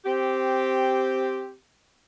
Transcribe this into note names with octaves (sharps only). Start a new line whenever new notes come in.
C4 G4